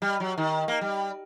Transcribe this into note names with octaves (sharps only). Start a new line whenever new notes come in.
G3
F#3
D#3
A#3
G3